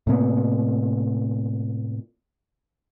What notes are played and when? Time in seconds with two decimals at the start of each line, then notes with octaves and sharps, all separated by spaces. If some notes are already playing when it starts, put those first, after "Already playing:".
0.07 A2 C3 A#3 B3